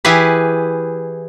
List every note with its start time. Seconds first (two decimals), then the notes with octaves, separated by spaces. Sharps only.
0.05 E3 E4 G4 G#4 B4